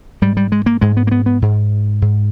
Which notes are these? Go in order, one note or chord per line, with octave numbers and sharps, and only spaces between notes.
G#2 G3
G3
G#3
A#3
G#2 G#3
B3
A#3
B3
B3
G#2
G#2